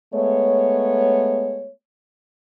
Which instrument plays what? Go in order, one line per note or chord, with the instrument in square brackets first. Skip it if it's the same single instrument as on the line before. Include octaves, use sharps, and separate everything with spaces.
[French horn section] G#3 A3 B3 C#5